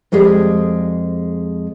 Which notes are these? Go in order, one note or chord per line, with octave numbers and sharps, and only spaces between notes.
F2 G#3 G4 G#4 D5